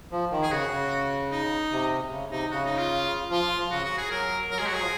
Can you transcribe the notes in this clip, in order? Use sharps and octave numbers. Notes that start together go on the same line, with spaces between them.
F3
D#3
G#4
C#3 F#4
C#3
D#4
C3
C#3
C3 D#4
C#3 F#4
D#4
F4
F3 F4
F3
C#3 F#4
F#4
G#4
F#3 A#4
F#3 A#4
G#3 G#4
F#4
F#3
G#4
F3